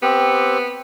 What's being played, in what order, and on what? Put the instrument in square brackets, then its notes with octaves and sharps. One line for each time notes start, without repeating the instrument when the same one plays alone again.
[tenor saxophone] B3 [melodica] C4 G4